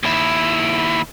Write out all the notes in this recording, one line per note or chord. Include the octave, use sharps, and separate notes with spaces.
D#2 E4